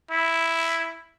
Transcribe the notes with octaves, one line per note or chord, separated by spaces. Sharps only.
E4